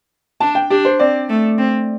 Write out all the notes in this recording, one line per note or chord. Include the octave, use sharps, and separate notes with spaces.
D4 A5
G5
D4 G4
C5
C4 D5
A3
C4